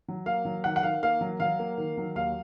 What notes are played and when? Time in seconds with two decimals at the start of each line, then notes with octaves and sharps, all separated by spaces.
0.08 F#3
0.26 A#3 F5
0.45 F#3
0.64 D#3 F#5
0.76 F#5
0.83 D#3 F5
1.03 A#3 F5
1.21 F#3
1.40 F#3 F5
1.59 A#3
1.78 D#3
1.97 F#3
2.15 D#2 F5